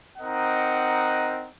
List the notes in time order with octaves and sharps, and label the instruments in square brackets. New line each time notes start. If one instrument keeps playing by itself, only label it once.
[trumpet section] C4 D#4 A#4 D#5 F#5